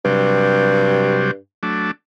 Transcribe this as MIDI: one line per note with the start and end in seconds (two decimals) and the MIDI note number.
0.05 1.37 43
0.05 1.31 48
0.05 1.31 54
0.05 1.31 55
1.63 1.91 54
1.63 1.91 57
1.63 1.91 62